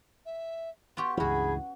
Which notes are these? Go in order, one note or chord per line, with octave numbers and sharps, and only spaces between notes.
E5
B3 F4 G4 C6 C#6
C#2 G2 E3 C#4 F#4 G#4 B5